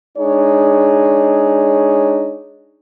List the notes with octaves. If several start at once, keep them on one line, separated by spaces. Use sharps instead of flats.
G#3 D4 D#4 G#4 C#5